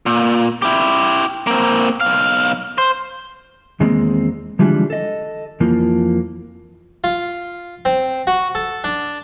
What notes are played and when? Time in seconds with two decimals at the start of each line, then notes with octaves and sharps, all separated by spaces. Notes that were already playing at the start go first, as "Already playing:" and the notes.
0.06 A#2
0.62 E4 G4
1.47 A#3 C4
2.01 B1 F5
2.78 C5
3.80 E2 D#3 G#3 A#3 C4
4.59 D3 E3 F3 G3 G#3 D4
4.90 A4 D#5
5.60 F2 E3 F3 A#3
7.04 F4
7.85 C4
8.27 F#4
8.55 A4
8.84 D4